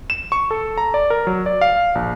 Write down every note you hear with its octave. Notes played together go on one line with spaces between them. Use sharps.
E7
C#6
A4
A#5
D5
A#4
F#3
D5
F5
A#1